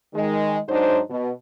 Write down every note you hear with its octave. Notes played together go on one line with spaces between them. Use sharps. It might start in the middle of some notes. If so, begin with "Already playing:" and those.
D#3 G#3
G#2 F#3 D4 D#4 C5
B2